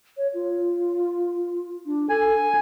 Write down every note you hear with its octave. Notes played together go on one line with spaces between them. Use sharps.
C#5
F4
D4
A4 G#5